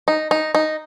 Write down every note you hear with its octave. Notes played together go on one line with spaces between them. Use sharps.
D#4
D#4
D#4